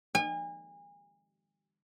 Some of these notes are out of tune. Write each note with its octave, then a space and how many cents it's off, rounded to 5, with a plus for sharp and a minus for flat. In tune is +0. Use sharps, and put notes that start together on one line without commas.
G#5 -35